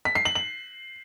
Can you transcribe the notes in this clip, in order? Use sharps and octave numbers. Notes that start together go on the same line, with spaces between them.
B6
C7
F#7
F#7